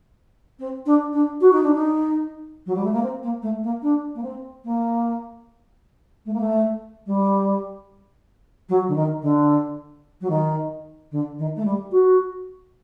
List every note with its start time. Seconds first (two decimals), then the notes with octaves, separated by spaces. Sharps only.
0.59 C4
0.86 D4
1.13 D4
1.41 F#4
1.52 D#4
1.63 D4
1.75 D#4
2.66 F#3
2.76 G3
2.84 A3
2.93 A#3
3.03 C4
3.23 A#3
3.42 A3
3.63 A#3
3.82 D4
4.15 A#3
4.23 C4
4.64 A#3
6.26 A3
6.34 A#3
6.40 A3
7.06 G3
8.69 F#3
8.88 D3
8.95 D#3
9.22 D3
10.21 F#3
10.30 D#3
11.11 D3
11.38 D#3
11.56 A3
11.65 G3
11.92 F#4